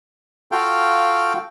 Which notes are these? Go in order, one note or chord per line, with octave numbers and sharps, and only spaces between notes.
F4 F#4 A4 F5 G5